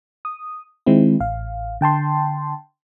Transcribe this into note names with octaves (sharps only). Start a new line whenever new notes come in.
D#6
D#3 G#3 C4 E4
A1 F5
D3 G5 A5 C6